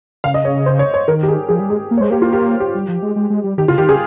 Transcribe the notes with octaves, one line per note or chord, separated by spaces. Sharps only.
C#3 F5
D#5
C#5
C5
C#5
C#5
D#3 A#4
G4
G#4
F3 G#4
G3
G#3 G#4
A#3
C#5
G#3 C5
A#3 G4
F4
G4
G4
G3
F3
G#3
G#3
G#3
G3
D#3 G4
C#3 F4
D#3 G4
C#3 G#4